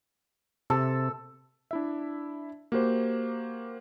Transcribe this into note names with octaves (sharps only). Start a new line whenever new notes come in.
C3 A4
D4 E4 E5
A#3 F#4 G4 C5